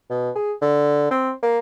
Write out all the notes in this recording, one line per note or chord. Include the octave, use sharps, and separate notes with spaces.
B2
G#4
D3
C4
A#3